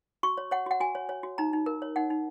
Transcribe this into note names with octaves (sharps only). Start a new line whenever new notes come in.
F#4 C#6
C#5
C#5 F#5
F#4 F#5
F#4 G#5
C#5
C#5
F#4
D#4 A#5
D#4
A#4
C#5
D#4 F#5
D#4